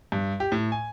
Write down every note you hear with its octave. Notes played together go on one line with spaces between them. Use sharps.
G2
G4
A2
G#5